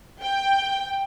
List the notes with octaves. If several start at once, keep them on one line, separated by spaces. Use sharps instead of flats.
G5